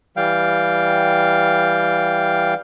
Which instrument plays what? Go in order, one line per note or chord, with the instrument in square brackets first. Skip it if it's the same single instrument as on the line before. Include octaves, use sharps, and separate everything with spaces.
[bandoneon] E3 G3 F5 G5